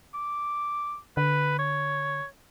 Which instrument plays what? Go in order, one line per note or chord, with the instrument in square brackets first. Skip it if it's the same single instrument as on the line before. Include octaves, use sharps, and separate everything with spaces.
[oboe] D6
[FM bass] D3 [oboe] B4
[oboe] C#5